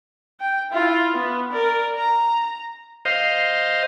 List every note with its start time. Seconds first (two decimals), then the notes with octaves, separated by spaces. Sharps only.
0.40 G5
0.71 E4 F4
1.14 B3
1.51 A#4 D5
1.96 A#5
3.05 C5 D#5 F5